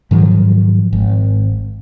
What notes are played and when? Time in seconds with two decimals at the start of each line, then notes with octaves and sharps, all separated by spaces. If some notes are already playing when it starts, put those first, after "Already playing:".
0.11 G#2 D#3 F3 F#3
0.93 G#1